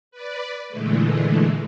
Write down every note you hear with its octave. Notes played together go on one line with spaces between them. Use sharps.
B4 D5
A#2 D3 E3 G#3 A3